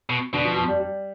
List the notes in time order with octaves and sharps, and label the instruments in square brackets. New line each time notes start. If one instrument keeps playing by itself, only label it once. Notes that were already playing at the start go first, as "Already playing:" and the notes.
[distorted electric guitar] B2
[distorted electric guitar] B2 [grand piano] D3
[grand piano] F3
F3
G3
G3